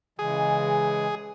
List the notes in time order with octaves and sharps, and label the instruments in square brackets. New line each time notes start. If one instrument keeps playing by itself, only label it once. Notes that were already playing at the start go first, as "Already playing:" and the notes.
[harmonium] C#3 E3 G#3 [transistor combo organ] G#4